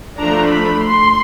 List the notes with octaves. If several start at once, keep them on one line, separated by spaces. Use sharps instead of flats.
F3 A3 D4 A#5
B5
C6